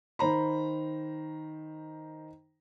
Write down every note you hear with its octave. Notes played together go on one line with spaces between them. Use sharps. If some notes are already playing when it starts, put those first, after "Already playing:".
D#3 C5 A#5 B5